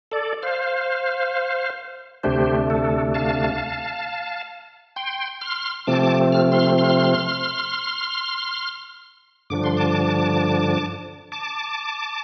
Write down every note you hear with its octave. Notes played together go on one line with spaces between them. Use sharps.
A4 D5
C5 F5
D2 C3 A3 D4 G4 C5
A4
F5 A5
G5 C6
C6 F6
C3 F3 A3 C4 A5 D6
F6
C6 F6
C6 F6
G2 D3 F3 D4 D6
C6
A5 D6
A5 D6